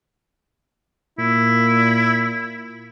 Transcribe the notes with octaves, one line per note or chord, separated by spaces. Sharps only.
A#2 E4